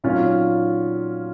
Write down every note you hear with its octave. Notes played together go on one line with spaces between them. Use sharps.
A#2 F#3 A#3 C#4 D#4 F4